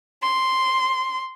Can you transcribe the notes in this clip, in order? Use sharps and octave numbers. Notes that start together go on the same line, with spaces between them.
C6